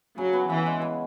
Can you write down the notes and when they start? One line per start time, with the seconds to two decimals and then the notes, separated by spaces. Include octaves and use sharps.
0.17 C#3 F#3
0.33 B3
0.50 C#3 E3
0.66 G#3
0.82 C#3